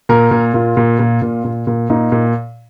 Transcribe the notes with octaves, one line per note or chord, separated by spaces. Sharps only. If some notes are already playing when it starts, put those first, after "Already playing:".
A#2 A#4
A#2
A#2 F4
A#2
A#2
A#2
A#2
A#2
A#2 D#4
A#2